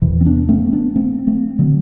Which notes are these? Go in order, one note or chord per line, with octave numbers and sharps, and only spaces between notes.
E2 C3 E3
C4
B3 D4
A3 C4
B3 D4
A3 C4
A3 C4
D3 F#3